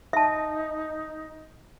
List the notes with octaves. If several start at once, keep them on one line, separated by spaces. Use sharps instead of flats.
D#4 E5 A5